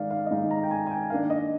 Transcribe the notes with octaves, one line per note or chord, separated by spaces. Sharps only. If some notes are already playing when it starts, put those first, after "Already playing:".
Already playing: D#3 G#3 D#4 D5 F5
F5
D#5
D#3 G#3 D#4 F5
A#5
G5
G#5
G#5
G5
D#3 A#3 D4 F5
D#5